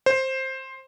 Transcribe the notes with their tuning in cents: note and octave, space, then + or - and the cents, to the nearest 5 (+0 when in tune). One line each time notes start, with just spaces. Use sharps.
C5 +10